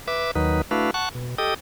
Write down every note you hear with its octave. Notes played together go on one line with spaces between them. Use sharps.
B4 E5 D6
D#2 D#3 F#3 D#4 B4
A3 D4 E4 F#4 B4 F5
F#5 A5 C#6 F#6
B2
G4 A4 D#5 G5 D#6